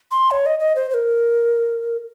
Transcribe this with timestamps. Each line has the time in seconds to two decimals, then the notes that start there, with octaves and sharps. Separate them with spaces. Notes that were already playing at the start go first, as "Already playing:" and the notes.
0.11 C6
0.31 C#5
0.46 D#5
0.60 D#5
0.76 C5
0.90 C5
0.94 A#4